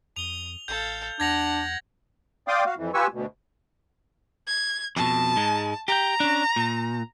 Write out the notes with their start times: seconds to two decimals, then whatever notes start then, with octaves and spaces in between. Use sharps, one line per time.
0.16 F2 D#6 F7 G7
0.68 A1 A4 F5 G6
1.20 E2 D4 F#5 G#6 A#6 F7
2.48 D5 F5 G5 C6 D6 D#6
2.66 F#4 F5
2.77 F2 E3
2.94 F4 G4 B4 G#5 C#6 E6
3.13 D2 B2
4.48 G#6
4.96 F2 B2 A5
5.36 G#2 G#3
5.88 G4 G5 A#5
6.20 C#4 D4
6.56 A#2